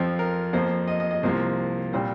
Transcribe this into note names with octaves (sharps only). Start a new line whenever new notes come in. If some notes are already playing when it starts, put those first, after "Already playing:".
Already playing: F2 F3 C4
A#4
F2 F3 A#3 C5
D#5
D#5
D#5
C2 C3 F3 A#3 C5
A#2 G3 C4 C5